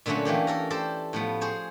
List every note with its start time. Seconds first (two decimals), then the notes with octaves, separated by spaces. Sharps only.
0.06 A#2 D3 F#3 A3 C#4
0.25 E3 A3 A#3 G4
0.47 A4 A#4 A#5
0.70 G4 A4 C5 D5 A5
1.13 A2 F3 B3
1.41 G#4 C5 C#5